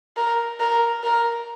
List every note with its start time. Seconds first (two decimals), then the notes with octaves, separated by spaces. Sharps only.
0.17 A#4
0.60 A#4
1.04 A#4